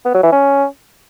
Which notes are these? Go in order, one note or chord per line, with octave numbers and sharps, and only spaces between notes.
B3
F#3
E3
C#4